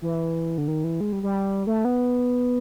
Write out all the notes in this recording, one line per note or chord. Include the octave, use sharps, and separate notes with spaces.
E3
D3
D#3
E3
G#3
G3
G3
A3
B3